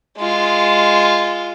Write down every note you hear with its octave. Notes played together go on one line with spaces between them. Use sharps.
G#3 F4